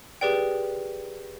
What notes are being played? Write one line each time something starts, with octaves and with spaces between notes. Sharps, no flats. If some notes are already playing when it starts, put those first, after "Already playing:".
G4 G#4 B4 D5 G5